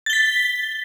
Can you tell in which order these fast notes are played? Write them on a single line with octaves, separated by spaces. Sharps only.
A6 G7 B6